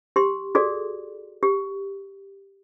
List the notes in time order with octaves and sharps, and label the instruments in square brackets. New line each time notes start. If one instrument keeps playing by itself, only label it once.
[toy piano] G4 C6
F#4 G#4 A4 D5
G4